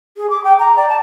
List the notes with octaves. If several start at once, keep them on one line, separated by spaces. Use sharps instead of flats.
G#4
D6
G5
A#5
D5
A5